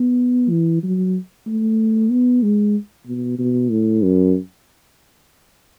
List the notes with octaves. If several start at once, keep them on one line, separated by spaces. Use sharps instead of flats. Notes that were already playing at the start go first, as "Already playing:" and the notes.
Already playing: B3
E3
F#3
A3
B3
G#3
B2
B2
A2
F#2